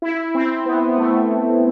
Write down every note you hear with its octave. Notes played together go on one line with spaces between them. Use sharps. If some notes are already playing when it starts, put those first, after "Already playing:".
E4
C4
B3
B3
A3